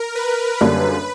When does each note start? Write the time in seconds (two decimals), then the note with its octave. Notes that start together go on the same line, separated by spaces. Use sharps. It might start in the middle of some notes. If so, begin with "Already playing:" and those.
Already playing: A#4
0.15 B4
0.61 F#2 D3 G3 A#3 D4 B4